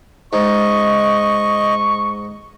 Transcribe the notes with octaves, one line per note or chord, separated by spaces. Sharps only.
G#2 D#5 C#6